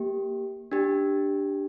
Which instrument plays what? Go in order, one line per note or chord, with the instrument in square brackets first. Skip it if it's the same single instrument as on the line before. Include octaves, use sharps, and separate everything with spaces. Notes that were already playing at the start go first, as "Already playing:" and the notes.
Already playing: [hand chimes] A#3 G4
D4 G4